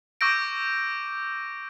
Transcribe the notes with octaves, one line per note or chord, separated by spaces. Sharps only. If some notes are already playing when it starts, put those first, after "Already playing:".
C#6 D6 E6 G6 A#6 D7